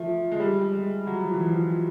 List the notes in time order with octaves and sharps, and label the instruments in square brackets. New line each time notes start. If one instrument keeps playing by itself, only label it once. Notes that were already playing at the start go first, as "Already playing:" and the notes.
Already playing: [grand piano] F3 [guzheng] A3
[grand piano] G#3
G3
G#3
F#3
F3
E3
F3